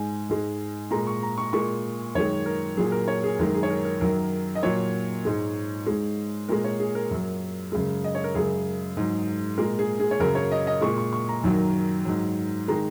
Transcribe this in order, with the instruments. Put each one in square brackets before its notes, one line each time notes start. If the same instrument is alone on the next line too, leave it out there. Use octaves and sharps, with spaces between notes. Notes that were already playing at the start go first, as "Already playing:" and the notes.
Already playing: [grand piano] G#2 G#3 G#5
G#2 G#3
A#2 G#3 A#5
C#6
A#5
C#6
A#2 G#3 C#6
F#2 D#3 G#3 C#5
A#4
A#2 F#3 G#4
A#4
C#5
G#4
F#2 D#3 G#3 A#4
G#4
C#5
A#4
A#4
F#2 D#3 F#3 A#4
D#5
A#2 F#3 C#5
G#2 G#3
G#2 G#3
A#2 G#3 A#4
C#5
G#4
A#4
F#2 F#3
F#2 C#3 G#3
D#5
C#5
A#4
F#2 C#3 G#3 G#4
G#2 F#3
A#2 G#3 A#4
G#4
G#4
C#5
F#2 C#3 F#3 A#4
C#5
D#5
D#5
A#2 G#3 C#6
C#6
C#6
A#5
F#2 D#3 F#3
G#2 F#3
D#3 G#3 A#5